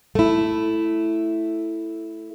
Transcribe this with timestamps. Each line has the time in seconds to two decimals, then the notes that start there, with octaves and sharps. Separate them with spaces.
0.15 A3 E4